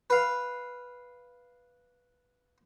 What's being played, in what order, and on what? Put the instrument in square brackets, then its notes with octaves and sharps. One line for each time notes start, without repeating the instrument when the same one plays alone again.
[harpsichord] B4 F5